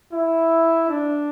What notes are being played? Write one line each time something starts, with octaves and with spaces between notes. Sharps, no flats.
E4
D4